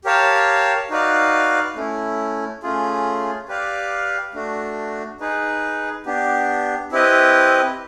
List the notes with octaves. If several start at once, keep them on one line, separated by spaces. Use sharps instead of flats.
G4 A#4 C#5 F5 A5
D#4 F#4 B4 D5 F5
A3 C#4 E4
A3 C#4 F4 G#4
G4 B4 D5 F5
A3 D4 F#4
D#4 G#4 B4
B3 D4 G4
C4 E4 G4 B4 D#5